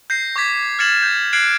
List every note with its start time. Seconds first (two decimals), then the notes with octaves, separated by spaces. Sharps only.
0.10 G6 A#6 C7
0.36 C#6 D6 G6 G#6 B6
0.79 F6 G#6 A6 C#7 E7 F#7
1.02 G6
1.33 F6 F#6 G#6 C7 D7 F#7